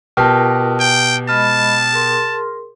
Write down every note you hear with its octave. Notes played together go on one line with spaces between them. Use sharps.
B2 F4 G4 A#4 A5 E6 F6
G5 G#5
G#3 D#5 A5 B5 F6
G#4 A#4 C6